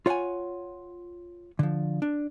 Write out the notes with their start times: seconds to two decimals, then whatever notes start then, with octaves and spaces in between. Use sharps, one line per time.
0.06 F4 C#5 F5 F#5 G#5
1.59 D3 F3
2.02 D4